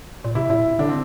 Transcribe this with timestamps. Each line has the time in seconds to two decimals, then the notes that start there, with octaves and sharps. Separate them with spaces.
0.24 A#2
0.35 C3 E4
0.50 A#2 E4
0.79 D3 D4
0.89 C4